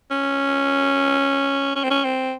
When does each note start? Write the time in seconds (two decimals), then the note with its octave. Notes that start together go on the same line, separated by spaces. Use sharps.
0.11 C#4
1.76 C#4
1.83 C4
1.91 C#4
2.04 C4